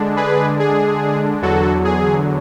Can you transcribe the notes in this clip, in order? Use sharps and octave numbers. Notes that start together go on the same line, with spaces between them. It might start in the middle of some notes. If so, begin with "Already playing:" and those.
Already playing: D3 G#3 D4
G#4 B4
G#4
E2 D3 F#3 F#4 A4
G#4